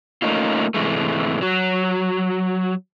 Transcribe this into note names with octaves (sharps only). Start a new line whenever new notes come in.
A3 A#3 C#4 D#4 F4
G#2 C3 E3 G#3 A3
F#3 F#4